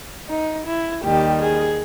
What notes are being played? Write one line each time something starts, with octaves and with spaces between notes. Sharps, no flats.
D#4
E4
D#2 D#3 G3 G4
G#4